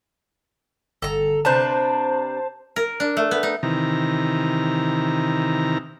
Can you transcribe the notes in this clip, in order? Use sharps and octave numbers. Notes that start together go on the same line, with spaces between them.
G1 A4 A#5
C3 D4 B4 C5 A5
A#4
D4
A3
B3
D#4
C3 D#3 E3 A#5